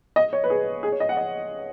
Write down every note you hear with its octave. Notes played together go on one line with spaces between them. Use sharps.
D#5
C#5
B4
G#4
G#4
C#5
D#5
F#5
D#5